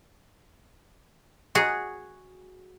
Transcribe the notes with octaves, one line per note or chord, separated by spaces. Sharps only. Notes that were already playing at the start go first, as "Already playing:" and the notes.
F#4 G#4